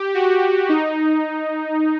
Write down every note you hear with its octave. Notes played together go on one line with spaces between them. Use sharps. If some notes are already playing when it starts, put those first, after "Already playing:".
Already playing: G4
F#4
D#4